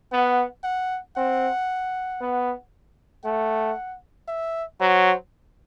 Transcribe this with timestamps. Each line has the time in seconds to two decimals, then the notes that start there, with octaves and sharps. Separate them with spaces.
0.12 B3 F#5
0.64 F#5
1.16 C4 F#5
2.21 B3
3.24 A3 F#5
4.28 E5
4.80 F#3 C5